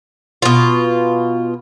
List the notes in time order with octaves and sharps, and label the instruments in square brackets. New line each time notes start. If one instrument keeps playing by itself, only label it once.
[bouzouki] B2 F4